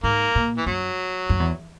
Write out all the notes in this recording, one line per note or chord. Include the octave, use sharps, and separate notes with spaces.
G#2 A#3
A#2
E3
F#2 F#3
F#2
E2